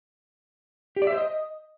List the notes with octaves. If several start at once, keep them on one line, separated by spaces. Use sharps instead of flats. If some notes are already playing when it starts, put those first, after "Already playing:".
G4
D5
E5
C5
D#5